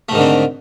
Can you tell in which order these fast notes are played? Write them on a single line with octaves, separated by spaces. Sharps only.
A3 G#2 D#3 D3 C4